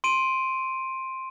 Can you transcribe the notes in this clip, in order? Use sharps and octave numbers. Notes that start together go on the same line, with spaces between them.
C6 D7 D#7